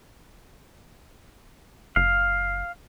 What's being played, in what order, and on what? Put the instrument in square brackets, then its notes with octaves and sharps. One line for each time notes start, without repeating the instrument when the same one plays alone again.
[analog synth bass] F#1 [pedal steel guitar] F5